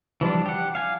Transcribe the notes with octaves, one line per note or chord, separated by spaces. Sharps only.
E3 F3 G3 D4
G4 F#5
F5 G#5